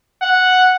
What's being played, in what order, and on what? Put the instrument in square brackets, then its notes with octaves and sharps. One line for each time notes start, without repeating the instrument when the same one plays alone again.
[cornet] F#5